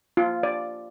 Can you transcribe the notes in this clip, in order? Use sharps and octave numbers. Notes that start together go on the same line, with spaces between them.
F4
D5